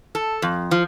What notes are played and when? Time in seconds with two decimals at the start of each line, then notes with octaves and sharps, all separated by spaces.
0.15 A4
0.42 F2
0.71 F3